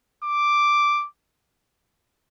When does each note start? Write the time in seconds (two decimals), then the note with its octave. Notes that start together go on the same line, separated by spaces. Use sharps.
0.24 D6